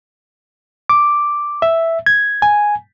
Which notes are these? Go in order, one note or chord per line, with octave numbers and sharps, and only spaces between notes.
D6
E5
G#6
G#5